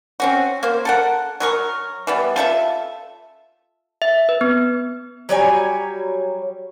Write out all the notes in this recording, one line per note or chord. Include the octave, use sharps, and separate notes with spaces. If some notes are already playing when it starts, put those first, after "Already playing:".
C4 C#4 F#4
A#3 C5
A4 A#4 F#5
F#3 A#4 C#6
E3 G3 B3
F4 A4 B4 E5
E5
B4
B3
F#3 G3 C#5 G#5